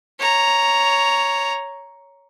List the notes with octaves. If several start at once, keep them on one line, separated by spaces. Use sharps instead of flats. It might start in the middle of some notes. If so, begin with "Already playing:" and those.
C#5 A#5